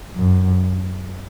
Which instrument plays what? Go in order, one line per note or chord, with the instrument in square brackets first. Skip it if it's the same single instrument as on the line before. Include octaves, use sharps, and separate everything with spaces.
[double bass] F#2